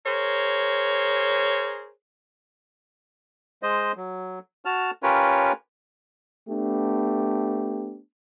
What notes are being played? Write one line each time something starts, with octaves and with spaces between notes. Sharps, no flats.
G#4 A#4 C5 C#5
G#3 C5 D#5
F#3
F#4 A5 F6
C#4 F4 G4 A#4 B4 C#5
A3 B3 D4 G4